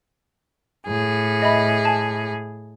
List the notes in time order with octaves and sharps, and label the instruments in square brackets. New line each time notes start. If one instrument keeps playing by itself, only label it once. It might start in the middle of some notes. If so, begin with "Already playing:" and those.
[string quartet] A2 G#4
[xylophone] D#5 E5 B5
G#5 A5